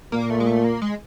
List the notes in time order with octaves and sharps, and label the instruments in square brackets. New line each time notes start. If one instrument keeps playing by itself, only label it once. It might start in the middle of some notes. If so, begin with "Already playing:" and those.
[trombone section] A#2 [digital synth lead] A#3
[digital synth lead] A3
G#3
A3
A#3
G#3